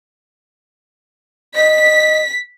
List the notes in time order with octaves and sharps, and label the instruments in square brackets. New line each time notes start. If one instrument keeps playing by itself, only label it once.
[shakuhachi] D#5 [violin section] B6